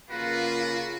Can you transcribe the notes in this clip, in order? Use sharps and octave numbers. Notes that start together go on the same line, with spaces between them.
C#3 A#3 F4 F#4 B4